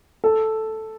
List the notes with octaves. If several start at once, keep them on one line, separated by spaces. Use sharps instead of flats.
A4